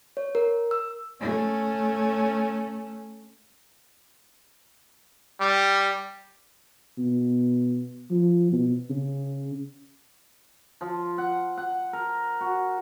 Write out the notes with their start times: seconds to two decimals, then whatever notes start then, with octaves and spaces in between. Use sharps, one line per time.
0.17 C#5
0.35 A#4
0.71 E6
1.21 A3 C#4
5.41 G3
6.98 B2
8.10 F3
8.52 B2
8.90 C#3
10.81 F3
11.18 F#5
11.58 F#5
11.93 A#4
12.41 F#4